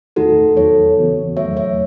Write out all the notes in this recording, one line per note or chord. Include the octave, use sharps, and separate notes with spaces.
E2 D#3 A3 D#4 F#4 A4
E2 D#3 F#3 A4 C#5
C#3 E3 B3 F#4
E2 D#3 F#3 A3 C#5 E5
C#5 E5